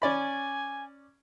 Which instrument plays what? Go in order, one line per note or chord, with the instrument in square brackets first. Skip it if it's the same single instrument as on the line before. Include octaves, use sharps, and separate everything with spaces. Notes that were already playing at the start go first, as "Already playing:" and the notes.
[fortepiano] C#4 D5 B5 [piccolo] G#5